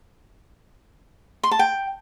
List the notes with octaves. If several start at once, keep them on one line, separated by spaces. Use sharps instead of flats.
C6
A5
G5